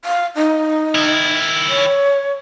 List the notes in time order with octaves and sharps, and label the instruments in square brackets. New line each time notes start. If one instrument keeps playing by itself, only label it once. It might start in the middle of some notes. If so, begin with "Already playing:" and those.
[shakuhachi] F5
D#4
[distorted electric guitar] D#3 E4
[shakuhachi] C#5